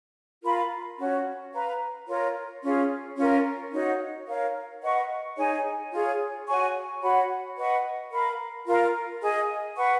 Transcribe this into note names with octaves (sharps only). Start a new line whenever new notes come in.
F4 A#4 F5 B5
C#4 F#4 C#5
B4 F5 A#5
F4 A#4 C#5
C#4 F4 G#4
C#4 F4 A#4
D#4 F#4 C#5
A#4 C#5 F5
B4 D#5 F#5 C#6
D#4 G#4 C#5 G#5
F4 G#4 C#5
F#4 C#5 G#5 C#6
F#4 C#5 F#5 B5
B4 D#5 F#5 C#6
A#4 F5 B5
F4 A#4 F5
G#4 D#5 G#5
B4 F#5 C#6